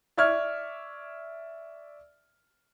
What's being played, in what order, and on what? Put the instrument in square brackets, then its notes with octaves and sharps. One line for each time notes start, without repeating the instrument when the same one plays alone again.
[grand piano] D5 E5 C#6 F6 G#6